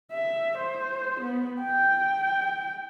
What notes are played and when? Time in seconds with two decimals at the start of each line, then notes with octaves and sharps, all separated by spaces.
0.12 E5
0.58 C5
1.20 B3
1.61 G5